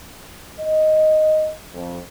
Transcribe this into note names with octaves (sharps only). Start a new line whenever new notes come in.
D#5
F2